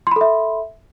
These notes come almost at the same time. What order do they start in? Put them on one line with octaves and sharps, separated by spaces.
C6 B5 A4 E5